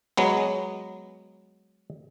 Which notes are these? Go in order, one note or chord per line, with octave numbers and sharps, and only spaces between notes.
F#3 G#3 B3